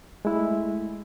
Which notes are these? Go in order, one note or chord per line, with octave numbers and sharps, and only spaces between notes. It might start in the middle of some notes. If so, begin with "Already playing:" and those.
G#3 A3 E4